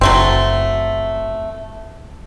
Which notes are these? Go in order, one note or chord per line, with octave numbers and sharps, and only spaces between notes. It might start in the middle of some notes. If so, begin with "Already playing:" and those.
F#1 F#3 A3 C4